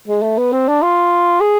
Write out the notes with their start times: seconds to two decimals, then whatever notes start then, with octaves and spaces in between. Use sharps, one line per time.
0.08 G#3
0.22 A3
0.38 B3
0.53 C4
0.68 D4
0.82 F4
1.41 G#4